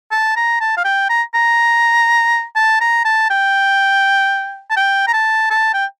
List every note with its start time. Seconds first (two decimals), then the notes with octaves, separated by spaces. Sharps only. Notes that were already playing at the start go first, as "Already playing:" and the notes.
0.12 A5
0.36 A#5
0.60 A5
0.77 F5
0.85 G5
1.10 A#5
1.34 A#5
2.56 A5
2.81 A#5
3.05 A5
3.30 G5
4.70 A5
4.77 G5
5.07 A#5
5.14 A5
5.50 A5
5.74 G5